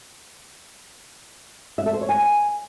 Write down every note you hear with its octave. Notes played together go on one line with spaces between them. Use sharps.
E5
A4
C5
C#5
G#5